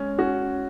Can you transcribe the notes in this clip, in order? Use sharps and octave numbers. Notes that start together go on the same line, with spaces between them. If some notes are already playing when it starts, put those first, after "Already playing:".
Already playing: G#3 C#4
C#4 F#4